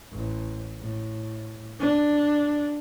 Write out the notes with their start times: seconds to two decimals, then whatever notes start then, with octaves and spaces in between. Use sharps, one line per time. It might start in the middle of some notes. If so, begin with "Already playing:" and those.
0.11 A1
0.81 A2
1.80 D4